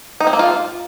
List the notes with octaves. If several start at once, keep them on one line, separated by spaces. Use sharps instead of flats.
D#4
C4
A#3
F4